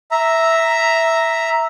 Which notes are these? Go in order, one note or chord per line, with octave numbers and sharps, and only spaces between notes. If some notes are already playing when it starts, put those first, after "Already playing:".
E5 A#5